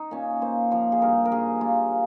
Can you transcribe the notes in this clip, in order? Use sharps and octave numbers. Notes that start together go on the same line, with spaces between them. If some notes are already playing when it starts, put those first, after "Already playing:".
Already playing: D#4
A#2 C#4
A#3 C5
F3 C5
G#4
G2 A#4
A#4
G2 G#4
A#3 F4